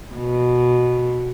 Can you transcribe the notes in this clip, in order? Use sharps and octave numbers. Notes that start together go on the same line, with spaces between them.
B2